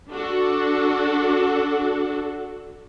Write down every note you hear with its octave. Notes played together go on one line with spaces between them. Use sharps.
D4 F#4 A4